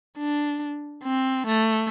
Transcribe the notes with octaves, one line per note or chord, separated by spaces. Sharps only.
D4
C4
A3